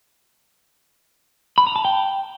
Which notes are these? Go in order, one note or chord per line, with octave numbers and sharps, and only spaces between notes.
B5
A#5
A5
G5